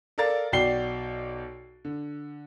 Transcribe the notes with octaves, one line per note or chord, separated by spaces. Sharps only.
A4 A#4 D5 F5 A6
B1 F#4 D5 G5 C7 G7
D3